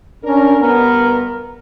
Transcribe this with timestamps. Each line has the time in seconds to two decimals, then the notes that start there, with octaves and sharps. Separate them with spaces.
0.24 C#4 D4 A#4
0.61 G2 B3 A#4